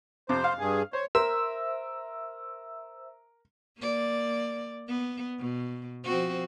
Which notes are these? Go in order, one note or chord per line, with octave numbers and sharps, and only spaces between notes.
F2 C3 C5 D6
F5
G2 G#4
C5 C#5
A#4 C5 E5 E6
A#3 D5
B3
B2
F3 C4 F#4